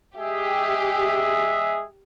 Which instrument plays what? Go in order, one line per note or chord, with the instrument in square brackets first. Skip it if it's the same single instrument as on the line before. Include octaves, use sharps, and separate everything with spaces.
[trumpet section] G#3 G#4 E5 [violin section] G4